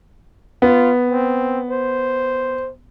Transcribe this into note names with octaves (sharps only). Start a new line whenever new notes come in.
B3 F4
C4
C5